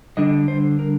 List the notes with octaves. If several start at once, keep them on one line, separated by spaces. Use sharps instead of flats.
D3 G3 D4 D#5
C5
A#4